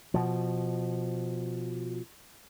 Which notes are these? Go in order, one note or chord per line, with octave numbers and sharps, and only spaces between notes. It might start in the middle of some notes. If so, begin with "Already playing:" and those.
B2 F3